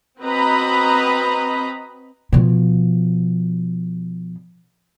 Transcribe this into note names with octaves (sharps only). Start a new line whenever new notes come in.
C4 F#4 B4 D#5 A#5 B5
B2 F3